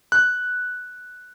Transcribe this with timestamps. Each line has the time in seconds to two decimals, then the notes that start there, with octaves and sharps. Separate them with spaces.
0.12 F#6